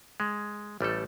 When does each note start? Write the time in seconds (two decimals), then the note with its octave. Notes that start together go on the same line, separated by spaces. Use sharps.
0.20 G#3
0.81 A1 G3 A3 A4